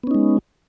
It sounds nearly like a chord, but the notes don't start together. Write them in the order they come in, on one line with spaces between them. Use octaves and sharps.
B3 C#4 D#4 G#3